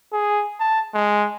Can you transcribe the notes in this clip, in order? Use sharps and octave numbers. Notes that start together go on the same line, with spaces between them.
G#4
A5
G#3